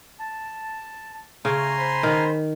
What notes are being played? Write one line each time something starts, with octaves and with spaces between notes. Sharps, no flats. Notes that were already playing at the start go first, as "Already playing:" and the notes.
A5
C#3 A3 G#5 A#5 C6
C5 B5
D#3